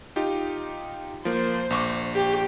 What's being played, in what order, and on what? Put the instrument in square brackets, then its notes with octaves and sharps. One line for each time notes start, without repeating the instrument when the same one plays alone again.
[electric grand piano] D#4 F4 G4
[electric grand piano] F3 A#3 [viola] C5
[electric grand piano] A#1 C#6 D6
[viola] G4